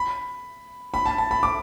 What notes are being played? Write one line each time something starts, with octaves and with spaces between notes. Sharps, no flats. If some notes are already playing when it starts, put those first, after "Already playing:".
Already playing: B5
B5
A5
A5
B5
D6